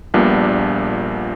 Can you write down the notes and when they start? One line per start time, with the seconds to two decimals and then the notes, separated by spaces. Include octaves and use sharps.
0.14 A#1 A#2 G3 B3 D4